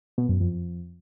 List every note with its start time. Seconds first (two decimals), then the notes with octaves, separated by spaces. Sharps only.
0.18 B2
0.29 F#2
0.40 F2